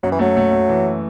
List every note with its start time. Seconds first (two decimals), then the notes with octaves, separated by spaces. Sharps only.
0.03 F#2 F#3
0.12 E3
0.19 F#3 A3
0.37 A3
0.52 A3
0.69 E3